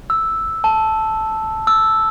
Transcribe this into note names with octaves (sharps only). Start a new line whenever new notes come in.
E6
A5
E6